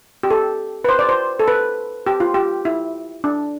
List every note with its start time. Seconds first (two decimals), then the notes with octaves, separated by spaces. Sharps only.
0.23 G4
0.31 A4
0.84 B4
0.89 C5
0.99 D5
1.09 C5
1.39 A4
1.48 B4
2.07 G4
2.20 F4
2.34 G4
2.65 E4
3.24 D4